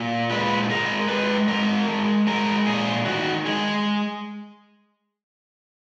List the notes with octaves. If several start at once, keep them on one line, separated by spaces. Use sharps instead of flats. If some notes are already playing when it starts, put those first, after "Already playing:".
Already playing: A#2
G#3 B4
G#3 A#4
G#3 B4
G#3 A#4
G#3
G#3 A#4
A#2 G#4
D#3 F#4
G#3 G#4